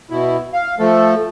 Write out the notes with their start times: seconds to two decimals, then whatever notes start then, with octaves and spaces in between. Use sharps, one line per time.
0.10 B2 E4
0.53 F5
0.79 F3 A3 A4